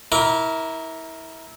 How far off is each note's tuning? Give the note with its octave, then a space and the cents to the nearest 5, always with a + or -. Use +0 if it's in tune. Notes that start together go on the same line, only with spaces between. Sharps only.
E4 -25 A#4 +0 D6 -35